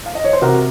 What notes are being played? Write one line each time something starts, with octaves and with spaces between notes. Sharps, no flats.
F5
D#5
C#5
C5
C3 F#4 A#4